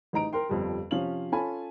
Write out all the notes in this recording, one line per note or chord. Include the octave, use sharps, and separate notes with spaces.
A1 D#4 A#5 D7
A#4 G5 C6
G1 F2 G3
C3 F3 C#4 F5 F#7
C#4 F4 A4 G#5 A5 B5